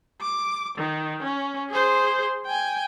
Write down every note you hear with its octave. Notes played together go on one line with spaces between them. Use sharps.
D6
D#3
C#4
G#4 C5
G5 G#5